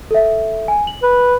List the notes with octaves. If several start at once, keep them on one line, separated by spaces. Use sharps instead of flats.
A4 E5
G#5
F#7
B4